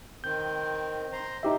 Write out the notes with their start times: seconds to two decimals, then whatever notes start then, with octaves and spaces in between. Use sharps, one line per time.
0.24 D#3 C4 G6
1.13 C5 A#5 C6
1.43 D2 A2 F3 D#4 G4 E5